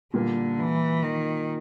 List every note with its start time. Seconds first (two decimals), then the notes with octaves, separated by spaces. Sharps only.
0.14 A#2 D3 G3 A#3
0.59 E3
1.03 D#3